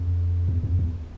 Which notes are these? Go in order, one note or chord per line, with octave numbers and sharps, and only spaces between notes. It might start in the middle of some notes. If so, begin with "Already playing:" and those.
Already playing: F2
E2
F2
E2